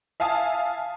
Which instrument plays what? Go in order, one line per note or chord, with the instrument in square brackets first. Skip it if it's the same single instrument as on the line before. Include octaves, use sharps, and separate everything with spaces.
[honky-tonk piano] E5 F5 G#5 A5 D#6